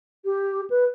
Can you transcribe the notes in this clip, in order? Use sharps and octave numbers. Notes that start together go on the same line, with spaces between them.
G4
B4